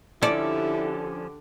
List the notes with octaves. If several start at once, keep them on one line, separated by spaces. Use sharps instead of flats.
D3 F3 C#4 D4 E4 G4 A4 D5